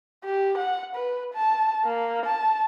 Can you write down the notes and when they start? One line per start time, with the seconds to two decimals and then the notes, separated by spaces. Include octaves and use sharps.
0.25 G4
0.58 F#5
0.95 B4
1.34 A5
1.85 A#3
2.26 A5